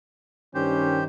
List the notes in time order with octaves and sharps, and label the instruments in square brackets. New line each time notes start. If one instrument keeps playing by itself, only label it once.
[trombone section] G2 D#3 [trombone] C#4 [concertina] G4 C5